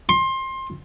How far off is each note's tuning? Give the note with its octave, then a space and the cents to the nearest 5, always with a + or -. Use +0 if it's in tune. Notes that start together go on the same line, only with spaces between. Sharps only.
C6 +25